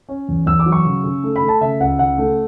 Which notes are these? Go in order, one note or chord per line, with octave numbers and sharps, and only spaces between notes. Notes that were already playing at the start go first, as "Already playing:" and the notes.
C#4
E2
E2 E6
D6
F#3
C#6
C#3
C#3
A3
B5
A3
A5
C#3 E5
C#2 F#5
C#3 F#5
A3